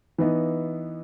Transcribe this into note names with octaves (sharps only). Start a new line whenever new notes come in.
E3 B3 D#4